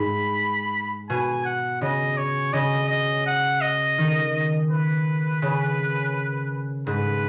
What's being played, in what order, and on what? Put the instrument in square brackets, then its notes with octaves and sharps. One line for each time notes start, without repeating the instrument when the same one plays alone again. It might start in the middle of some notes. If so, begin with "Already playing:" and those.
Already playing: [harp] G#2 [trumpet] B5
[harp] B2 [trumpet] G#5
[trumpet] F#5
[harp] C#3 [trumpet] D#5
[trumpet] C#5
[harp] C#3 [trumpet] D#5
[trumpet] D#5
F#5
D#5
[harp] D#3
[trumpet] B4
[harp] C#3
[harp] G#2 [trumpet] B4